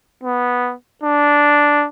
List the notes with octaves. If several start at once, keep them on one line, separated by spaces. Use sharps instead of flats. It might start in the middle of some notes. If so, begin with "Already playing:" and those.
B3
D4